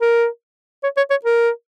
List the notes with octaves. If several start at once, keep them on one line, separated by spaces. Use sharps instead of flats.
A#4
C#5
C#5
C#5
A#4